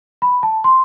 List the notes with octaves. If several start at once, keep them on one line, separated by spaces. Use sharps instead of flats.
B5
A5
C6